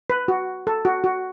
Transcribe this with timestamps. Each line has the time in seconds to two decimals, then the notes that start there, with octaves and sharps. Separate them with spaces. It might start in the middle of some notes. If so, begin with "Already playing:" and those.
0.10 B4
0.28 F#4
0.67 A4
0.85 F#4
1.04 F#4